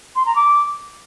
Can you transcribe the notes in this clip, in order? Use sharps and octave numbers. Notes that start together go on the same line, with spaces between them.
C6
A#5
D6